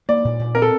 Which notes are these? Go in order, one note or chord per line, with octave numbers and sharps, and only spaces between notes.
A#3 D5
A#2
A#2
C4 A#4
A4